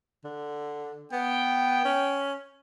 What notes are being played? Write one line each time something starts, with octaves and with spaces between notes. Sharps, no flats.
D3
B3 G5
C#4